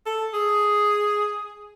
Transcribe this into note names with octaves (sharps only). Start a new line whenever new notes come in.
A4
G#4